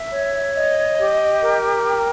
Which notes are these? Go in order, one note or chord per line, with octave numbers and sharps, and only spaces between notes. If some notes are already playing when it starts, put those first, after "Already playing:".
Already playing: E5
C#5
D#5
G4
A#4
G5